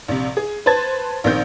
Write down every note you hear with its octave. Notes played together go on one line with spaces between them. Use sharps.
A#1 C3
G#4
B4 C5 A5 G#6 A6
A#1 D#3 C4 G6